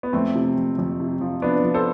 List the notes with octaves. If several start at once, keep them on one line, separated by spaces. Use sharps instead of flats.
B3
F2 A3 C4
C3
F2
F2
C3
F3
F3 B3 D4
F3
A4 C5